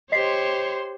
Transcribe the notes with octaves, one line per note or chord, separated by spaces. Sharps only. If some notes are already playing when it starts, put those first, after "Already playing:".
G4 C5 C#5 D#5 C6 B6 C7